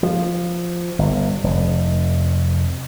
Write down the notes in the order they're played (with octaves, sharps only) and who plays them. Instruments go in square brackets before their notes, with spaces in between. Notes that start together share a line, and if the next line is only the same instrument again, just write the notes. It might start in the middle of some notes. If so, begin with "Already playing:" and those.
[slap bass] F3
G1
F1